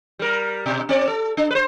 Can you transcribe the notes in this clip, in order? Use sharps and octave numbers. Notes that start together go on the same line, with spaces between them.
G3 A#4
B2
C4 D5
A4
D4
B4 C5